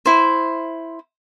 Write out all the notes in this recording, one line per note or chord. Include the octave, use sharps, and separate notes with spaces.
E4 C5